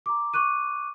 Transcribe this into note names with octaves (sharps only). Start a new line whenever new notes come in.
A#5 D6
C#6 D6 F#6 D#7